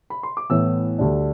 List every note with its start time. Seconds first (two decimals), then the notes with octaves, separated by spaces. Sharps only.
0.10 B5
0.23 C6
0.37 D6
0.50 A2 E3 B3 E6
0.98 D2 D3 G3 D4